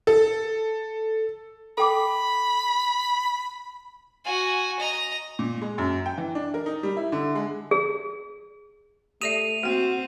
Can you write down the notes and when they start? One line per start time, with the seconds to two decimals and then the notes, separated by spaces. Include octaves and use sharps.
0.07 A4
1.78 A4 G5 B5 D6
4.24 F#4 G#5
4.80 D#5 A#5
5.39 A#2
5.62 G#3
5.78 F#2
6.06 G5
6.18 E3
6.35 D4
6.54 A#4
6.66 D#4
6.83 G3
6.97 E4
7.12 D3
7.35 G#3
7.71 G#4
9.21 A3 G4 D5 E5 D#7 F7
9.63 A#3 C4 F#4 G5